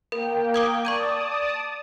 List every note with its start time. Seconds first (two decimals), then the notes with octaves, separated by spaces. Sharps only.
0.12 A#3 A#4 G5
0.54 D6 D#6 G#6
0.85 D5 A5 C#6 D#6 G#6 D#7